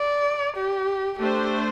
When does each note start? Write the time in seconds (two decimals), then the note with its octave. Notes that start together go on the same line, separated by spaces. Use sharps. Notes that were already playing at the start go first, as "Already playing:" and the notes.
Already playing: D5
0.56 G4
1.19 A3 D4 G4 C5